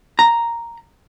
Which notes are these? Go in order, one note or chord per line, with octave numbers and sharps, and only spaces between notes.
A#5